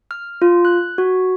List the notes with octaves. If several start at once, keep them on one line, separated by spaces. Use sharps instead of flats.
F6
F4
F#6
F#4